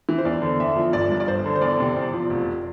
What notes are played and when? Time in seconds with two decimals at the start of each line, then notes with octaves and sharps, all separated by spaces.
0.09 E3
0.18 C5
0.25 E2 D5
0.42 D3
0.59 E2 E5
0.76 F3
0.93 G1 D5
1.10 G2
1.20 D5
1.27 G1 C5
1.46 D3
1.55 C5
1.61 E2 D5
1.80 C3
1.96 E2
2.14 F3
2.30 F1